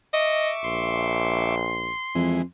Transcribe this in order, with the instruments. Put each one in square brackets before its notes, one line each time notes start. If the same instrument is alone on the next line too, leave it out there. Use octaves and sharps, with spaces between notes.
[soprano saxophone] D#5 [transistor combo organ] E5 C#6 D6
[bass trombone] A#1 [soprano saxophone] C6
[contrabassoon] F2 [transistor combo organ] E3 G#3